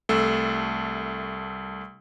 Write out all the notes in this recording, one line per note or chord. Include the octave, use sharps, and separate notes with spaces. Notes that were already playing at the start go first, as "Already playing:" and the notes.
C2 A3 A4 E6